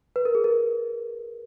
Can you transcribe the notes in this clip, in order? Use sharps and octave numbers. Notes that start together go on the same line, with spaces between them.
B4
A#4
G#4
A#4